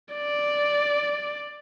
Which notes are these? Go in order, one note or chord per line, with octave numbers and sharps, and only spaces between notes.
D5